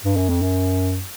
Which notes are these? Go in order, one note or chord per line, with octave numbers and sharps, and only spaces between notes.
G2
F#2
F2
F#2